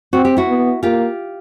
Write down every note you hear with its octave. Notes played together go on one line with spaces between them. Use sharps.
C4 F#4
G4
E4 F#4
B3
A#3 F4 G4